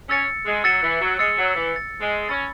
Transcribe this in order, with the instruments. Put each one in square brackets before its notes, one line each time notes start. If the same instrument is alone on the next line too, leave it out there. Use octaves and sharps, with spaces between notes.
[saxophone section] C#4 [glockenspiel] E6 A6 C#7
[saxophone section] G#3
[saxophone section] F#3 [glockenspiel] E6 A6 C#7
[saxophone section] E3
F#3
[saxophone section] G#3 [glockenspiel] E6 A6 C#7
[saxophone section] F#3
E3
[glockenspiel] E6 A6 C#7
[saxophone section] G#3
[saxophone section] C#4 [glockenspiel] B5 E6 A6